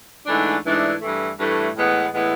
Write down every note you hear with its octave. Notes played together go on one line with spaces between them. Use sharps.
G#2 E3 A3 D4
G#2 E3 A3 D4
G2 E3 A3
G2 E3 A3
A2 E3 G#3 B3
A2 E3 G#3 B3